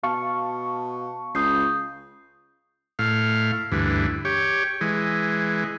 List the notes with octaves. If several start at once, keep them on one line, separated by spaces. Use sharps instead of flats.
B2 F5 A5 C#6
C#2 D#6 G6 C7
A2 F5
D2 G2 E3
G4 C#5
E3 G#3